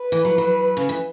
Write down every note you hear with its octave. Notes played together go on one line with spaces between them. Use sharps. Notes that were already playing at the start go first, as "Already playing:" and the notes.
Already playing: B4
E3
F#3
F#3
C#3
E3